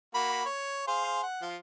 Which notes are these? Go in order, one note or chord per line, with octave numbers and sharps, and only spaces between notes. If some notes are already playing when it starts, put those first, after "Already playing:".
A#3 F#4 B5
C#5
G#4 C5 F5
F#5
F3 F4